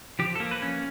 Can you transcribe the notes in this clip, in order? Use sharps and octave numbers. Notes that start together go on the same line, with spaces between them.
F3 G4
A4
A#3
B4
C#4